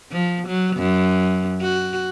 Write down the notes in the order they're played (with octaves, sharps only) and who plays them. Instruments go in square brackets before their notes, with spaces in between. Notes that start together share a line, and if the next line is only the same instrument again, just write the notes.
[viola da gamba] F3
F#3
F#2
F#4